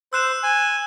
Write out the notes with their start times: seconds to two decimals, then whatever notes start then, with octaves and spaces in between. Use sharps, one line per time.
0.13 C5 E6 F#6 E7
0.43 G#5